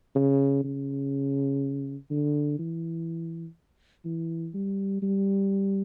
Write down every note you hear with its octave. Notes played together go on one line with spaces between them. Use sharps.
C#3
C#3
D3
E3
E3
G3
G3